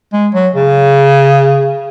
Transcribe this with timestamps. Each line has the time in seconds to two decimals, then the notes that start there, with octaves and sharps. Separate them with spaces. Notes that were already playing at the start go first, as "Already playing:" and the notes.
0.13 G#3
0.34 F#3
0.55 C#3